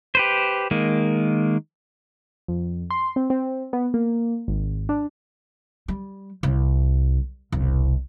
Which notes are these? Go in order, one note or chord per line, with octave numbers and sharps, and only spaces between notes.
G4 B4 C5
D#3 G#3 A#3
F2
C6
C4
C4
B3
A#3
G#1
D4
G3
C2
E1 C2